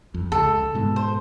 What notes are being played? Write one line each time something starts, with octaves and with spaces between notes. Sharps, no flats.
F2
C#2 A4
G#2 B2 G#3
C5